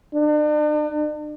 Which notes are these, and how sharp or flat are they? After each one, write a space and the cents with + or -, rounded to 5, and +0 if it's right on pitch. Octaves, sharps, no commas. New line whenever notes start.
D4 +40